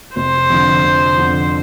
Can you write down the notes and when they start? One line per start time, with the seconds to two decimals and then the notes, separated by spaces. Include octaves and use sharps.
0.16 F1 C5
0.50 F2 D3
0.84 F1
1.18 F2 D3